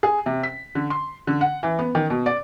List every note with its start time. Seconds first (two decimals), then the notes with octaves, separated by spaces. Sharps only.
0.03 G#4
0.26 C3
0.43 B6
0.75 D3
0.90 C6
1.27 D3
1.41 F#5
1.63 E3
1.79 B3
1.95 D#3
2.10 B2
2.26 D5